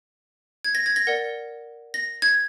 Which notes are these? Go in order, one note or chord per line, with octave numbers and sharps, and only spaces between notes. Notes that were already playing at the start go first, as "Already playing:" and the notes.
G#6
A#6
G#6
A#6
A#4 D5 F#5
A#6
G#6